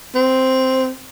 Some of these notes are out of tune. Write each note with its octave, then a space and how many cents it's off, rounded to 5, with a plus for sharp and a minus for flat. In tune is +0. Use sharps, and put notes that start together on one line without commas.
C4 -5